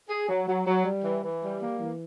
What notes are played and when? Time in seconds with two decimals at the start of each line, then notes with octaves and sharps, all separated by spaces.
0.09 G#4
0.29 F#3
0.48 F#3
0.67 F#3
0.85 G3
1.04 E3
1.24 E3
1.43 G3
1.62 A#3
1.80 E3